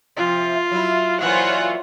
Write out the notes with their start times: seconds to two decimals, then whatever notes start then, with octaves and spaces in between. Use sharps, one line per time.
0.16 C3 F3 F4
0.72 F#3 E4
1.21 A#2 E3 F#3 F4 C5 C#5 F#5